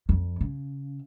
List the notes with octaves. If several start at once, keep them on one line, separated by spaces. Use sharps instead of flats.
F2
C#3